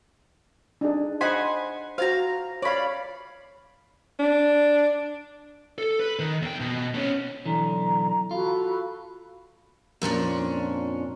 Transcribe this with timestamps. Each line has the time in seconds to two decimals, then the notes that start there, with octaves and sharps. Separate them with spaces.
0.81 D4 D#4 G#4
1.21 C5 D#5 F#5 G#5 B5 C6
1.98 F#4 C5 F5 A5 A#5
2.62 C#5 D5 F5 B5
4.20 D4
5.78 A4
5.99 B4
6.19 D#3
6.42 E2 G5
6.60 B2
6.95 B3 C#4
7.46 B1 D3 E3 A#5
8.31 F4 F#4 A4 B5
10.02 F2 A#2 C#4 D4